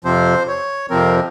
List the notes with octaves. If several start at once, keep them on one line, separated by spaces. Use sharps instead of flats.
F2 C3 F3 C4 C5
C#5
F2 C3 F3 C4 A#4